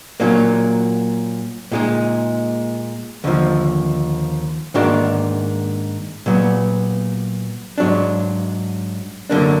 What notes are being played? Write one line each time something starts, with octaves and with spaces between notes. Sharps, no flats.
A#2 F#3 A#3 D4
A#2 G#3 D#4
D#2 D3 F3
G#2 D#3 A#3 D4 F#4
A#2 F#3 B3
G#2 F#3 D4
F#2 D3 F#3 A#3 D4